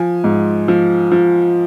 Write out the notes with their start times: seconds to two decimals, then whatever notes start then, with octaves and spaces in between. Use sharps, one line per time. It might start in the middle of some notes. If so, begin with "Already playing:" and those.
Already playing: F3 G#5
0.24 G#2
0.68 F3
1.12 F3